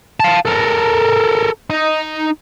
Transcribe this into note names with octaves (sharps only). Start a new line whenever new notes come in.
F5 A5
A4 A#4
D#4